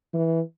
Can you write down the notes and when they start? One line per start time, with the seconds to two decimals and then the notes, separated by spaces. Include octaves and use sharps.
0.14 E3